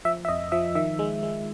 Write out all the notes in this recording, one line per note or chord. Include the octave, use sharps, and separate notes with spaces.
F3 E5
E5
F2 D#5
F3 E5
D#3 E5
G#3
G#3